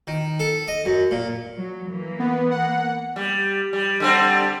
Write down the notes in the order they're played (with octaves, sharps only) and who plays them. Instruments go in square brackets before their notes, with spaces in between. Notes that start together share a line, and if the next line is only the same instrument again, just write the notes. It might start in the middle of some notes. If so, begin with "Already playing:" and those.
[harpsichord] D#3
A4
D#5
F#2
A#2
[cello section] F#3
E3 A#3
[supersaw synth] B3
[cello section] A#3 [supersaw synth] F#5
[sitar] G3
G3
D3 G3 C4